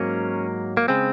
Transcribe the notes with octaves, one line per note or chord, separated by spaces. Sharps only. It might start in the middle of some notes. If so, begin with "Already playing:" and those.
Already playing: G#2 F#3 A#3 C#4
A#3
C#3 G#3 C4